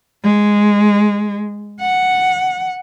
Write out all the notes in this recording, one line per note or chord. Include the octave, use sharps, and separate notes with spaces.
G#3
F#5